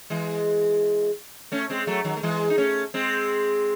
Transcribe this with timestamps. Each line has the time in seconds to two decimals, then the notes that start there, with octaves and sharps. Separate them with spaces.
0.10 E3 G#3
1.52 A3 C#4
1.70 G#3 C4
1.87 F#3 A3
2.05 D#3 F#3
2.17 A3
2.23 E3 G#3
2.50 D#4
2.58 A3 C#4
2.94 G#3 C4